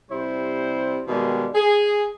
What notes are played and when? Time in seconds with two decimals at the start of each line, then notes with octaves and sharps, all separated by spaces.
0.10 C3 G3 E4 C5
1.07 B2 D#3 G3 G#3 A#3
1.55 G#4